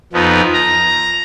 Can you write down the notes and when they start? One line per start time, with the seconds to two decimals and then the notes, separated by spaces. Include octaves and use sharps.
0.12 F2 F3 B3 D#4
0.53 A#5